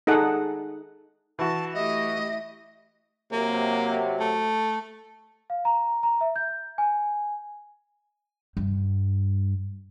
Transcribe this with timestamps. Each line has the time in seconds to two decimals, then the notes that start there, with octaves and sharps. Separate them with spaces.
0.07 D#4 G#4 A4 F#5
1.39 E3 F#4 A5
1.74 A3 E4 G4 D#5 E5
3.32 C3 F#3 A#3
4.20 A3
5.50 F5
5.65 A#5
6.03 A#5
6.21 E5
6.36 G6
6.78 G#5
8.57 G2